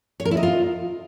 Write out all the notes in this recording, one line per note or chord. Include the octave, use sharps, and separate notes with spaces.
C#5
A#4
E4
D#5
F4